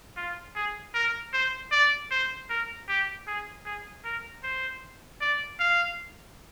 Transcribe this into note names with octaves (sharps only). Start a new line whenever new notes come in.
F4
G#4
A#4
C5
D5
C5
A#4
G4
G#4
G#4
A#4
C5
D5
F5